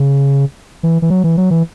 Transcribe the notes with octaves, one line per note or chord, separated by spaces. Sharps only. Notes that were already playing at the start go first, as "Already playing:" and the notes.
Already playing: C#3
E3
E3
F#3
E3
F#3
E3